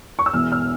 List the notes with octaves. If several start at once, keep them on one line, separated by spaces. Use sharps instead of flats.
C#6
E6
E1 E2 E3 F6
F6